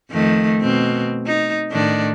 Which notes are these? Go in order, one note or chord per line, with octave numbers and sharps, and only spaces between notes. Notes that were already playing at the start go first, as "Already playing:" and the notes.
F2 D#3 A3
B2 C4
D#4
A2 D#3 D4